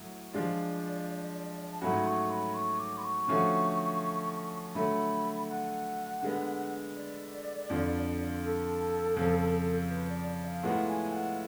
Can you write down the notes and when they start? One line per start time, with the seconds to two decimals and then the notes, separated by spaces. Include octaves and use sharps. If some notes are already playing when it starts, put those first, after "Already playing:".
Already playing: A2 F#3
0.33 F3 G#3 D4 F4 D5
1.71 A5
1.81 G#2 F#3 A3 C#4 F#4 B5
2.05 C#6
2.30 B5
2.54 C#6
2.79 D6
2.98 B5
3.03 C#6
3.28 D3 F3 A3 C#4 F#4
4.75 D3 F#3 A3 B5
5.49 F#5
6.23 D3 G#3 B3
6.96 D5
7.70 F2 D3 F3
8.43 A4
9.17 F2 C#3 F3
9.90 B4
10.09 D5
10.27 D5
10.45 F5
10.63 A2 G#3 B3 F4 F#5
10.88 G#5
11.13 F#5